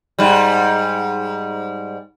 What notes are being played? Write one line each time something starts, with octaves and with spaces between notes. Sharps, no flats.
G#2 G3